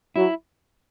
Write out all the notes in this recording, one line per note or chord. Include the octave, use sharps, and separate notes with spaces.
F#3 E4